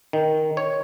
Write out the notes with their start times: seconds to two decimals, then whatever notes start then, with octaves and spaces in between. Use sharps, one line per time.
0.13 D#3
0.57 C#5